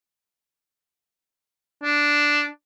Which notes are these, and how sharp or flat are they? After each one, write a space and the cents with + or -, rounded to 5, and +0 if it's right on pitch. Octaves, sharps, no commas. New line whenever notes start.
D4 -5